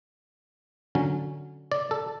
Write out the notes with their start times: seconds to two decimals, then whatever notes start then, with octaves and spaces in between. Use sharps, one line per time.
0.95 D3 F#3 C#4
1.72 D5
1.91 A4